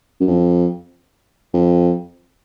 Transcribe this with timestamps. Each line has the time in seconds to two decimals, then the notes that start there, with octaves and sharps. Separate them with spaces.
0.20 F#2
0.28 F2
1.54 F2